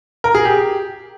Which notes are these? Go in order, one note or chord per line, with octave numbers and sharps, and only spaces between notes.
A#4
G#4
G4